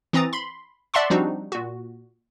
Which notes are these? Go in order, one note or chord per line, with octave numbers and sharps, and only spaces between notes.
E3 C4 A#5 D#6 A6
B5 C6
D5 E5 F#5 A5 C6 C#6
F3 G3 C4 D4 D#4 F#4
A#2 F#4